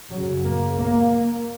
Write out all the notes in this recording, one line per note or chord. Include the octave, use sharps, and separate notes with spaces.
F#2 C#3 F#3
A#3
A#3